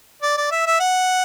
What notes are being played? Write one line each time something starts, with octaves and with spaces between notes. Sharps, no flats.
D5
D5
E5
E5
F#5